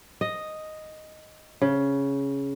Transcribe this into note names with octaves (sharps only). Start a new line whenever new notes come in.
D#5
C#3